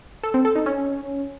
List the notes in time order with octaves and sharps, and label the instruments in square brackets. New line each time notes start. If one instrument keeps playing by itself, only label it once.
[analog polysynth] A4
C4
A4
D#4
C#4